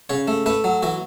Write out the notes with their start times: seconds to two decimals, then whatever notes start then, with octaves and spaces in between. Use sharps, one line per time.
0.09 C#3 C#5
0.28 A3
0.46 A3 B4
0.64 F#3
0.83 E3 F#4